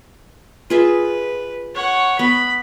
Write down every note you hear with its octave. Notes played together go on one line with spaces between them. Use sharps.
F4 G#4 B4 E5
C#5 F#5
B3 B5